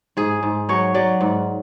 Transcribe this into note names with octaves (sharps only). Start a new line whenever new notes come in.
G#2 G#4
G#2
F#3 C#5
F#3 D5
G#2